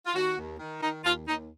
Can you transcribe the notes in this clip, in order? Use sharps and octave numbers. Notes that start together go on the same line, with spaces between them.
F4
D#2 F#4
D#2
D#3
D#3 D#4
D#2 F4
D#2 D#4